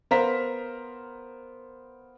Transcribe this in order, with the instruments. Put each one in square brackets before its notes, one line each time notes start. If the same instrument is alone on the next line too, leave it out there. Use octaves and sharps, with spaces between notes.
[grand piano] B3 A#4 C5 F5 A#5 B6